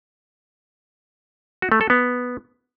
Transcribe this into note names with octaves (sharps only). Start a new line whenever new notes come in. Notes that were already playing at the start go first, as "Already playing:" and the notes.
F#4
A3
A4
B3